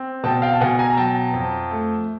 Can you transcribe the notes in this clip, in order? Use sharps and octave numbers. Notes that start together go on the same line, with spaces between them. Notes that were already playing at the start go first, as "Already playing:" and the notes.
Already playing: C4
B2 G5 A5
F5 G5
A5
B2 F#5 G#5
G#5 A#5
A#5
F#3 G5 A5
F2
A3